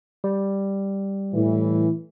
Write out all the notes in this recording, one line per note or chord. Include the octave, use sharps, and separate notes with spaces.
G3
A2 E3